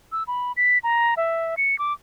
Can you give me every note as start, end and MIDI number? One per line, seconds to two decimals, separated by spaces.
0.12 0.23 88
0.27 0.52 83
0.57 0.78 95
0.83 1.14 82
1.17 1.55 76
1.57 1.78 97
1.79 1.93 86